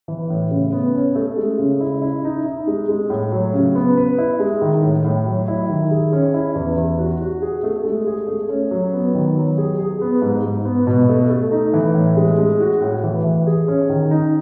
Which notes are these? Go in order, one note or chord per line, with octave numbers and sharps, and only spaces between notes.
E3
A2
C#3
B3
C#4
A3
G#3
C#3
E4
E4
D#4
D#4
G#3
G#3
A2
F#3
C#3
B3
B4
E4
G#3
D#3
A2
A2
F#3
E4
D#3
G#4
C#4
E4
E2
E2
F#4
F#4
G#4
A3
G#3
G#4
A3
C#4
F#3
B3
D#3
F#3
G#4
G#4
B3
G#2
G#2
B3
B2
A3
A3
D#4
E3
A2
G#3
G#3
F#4
A2
E3
E3
G#4
C#4
D#3
D#4